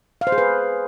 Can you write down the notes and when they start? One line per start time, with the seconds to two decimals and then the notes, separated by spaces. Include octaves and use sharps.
0.21 F5
0.27 C5
0.32 G#4
0.38 B4